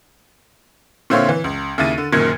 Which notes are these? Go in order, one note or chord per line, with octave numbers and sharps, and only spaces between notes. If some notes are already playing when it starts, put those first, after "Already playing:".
A#2 D3 C4 E4 C#5 F5
E3
C#2
D#2 C#3 E4 A6 D#7
D3
F#1 F#2 A#2 D#3 G#6 C#7